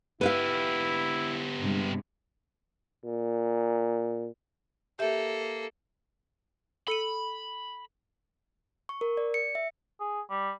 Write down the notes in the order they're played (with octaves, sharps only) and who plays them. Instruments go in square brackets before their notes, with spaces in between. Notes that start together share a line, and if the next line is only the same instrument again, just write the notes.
[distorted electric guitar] B3 G4 [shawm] E4 [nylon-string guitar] B4 E5 F5
[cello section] G2 C3 G#3
[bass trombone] A#2
[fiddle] A#3 A4 [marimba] G4 E5
[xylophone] A4 C#7 D#7 [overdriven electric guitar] B5
[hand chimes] C#6
A#4
D5
C#7
E5
[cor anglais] G#4
G3